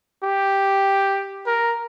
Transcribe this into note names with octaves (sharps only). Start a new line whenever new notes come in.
G4
A#4